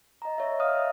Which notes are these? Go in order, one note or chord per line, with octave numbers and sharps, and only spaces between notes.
D#5 A#5
C#5 E5
D#5 F5 D#6 F6
C#5 E5 D#6